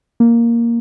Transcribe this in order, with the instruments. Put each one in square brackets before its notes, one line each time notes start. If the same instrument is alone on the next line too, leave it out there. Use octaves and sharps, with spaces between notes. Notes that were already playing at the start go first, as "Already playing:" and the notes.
[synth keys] A#3